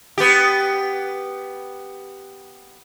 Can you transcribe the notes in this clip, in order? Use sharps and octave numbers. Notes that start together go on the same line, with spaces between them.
B3 G4